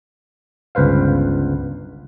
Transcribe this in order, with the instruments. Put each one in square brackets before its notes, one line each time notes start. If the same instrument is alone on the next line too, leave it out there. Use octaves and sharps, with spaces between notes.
[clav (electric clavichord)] G1 C#2 B4 C5 F5